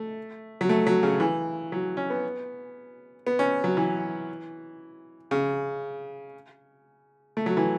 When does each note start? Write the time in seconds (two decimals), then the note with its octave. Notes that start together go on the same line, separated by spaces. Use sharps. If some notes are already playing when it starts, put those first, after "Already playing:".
Already playing: A3
0.61 F#3
0.69 A3
0.87 F#3
1.03 C#3
1.20 E3
1.72 F#3
1.97 C#4
2.10 B3
3.27 B3
3.39 C#4
3.64 F#3
3.77 E3
5.31 C#3
7.37 A3
7.46 F#3
7.57 E3